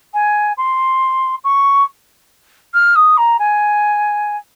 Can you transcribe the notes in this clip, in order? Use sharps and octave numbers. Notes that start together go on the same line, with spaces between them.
G#5
C6
C#6
F6
D#6
A#5
G#5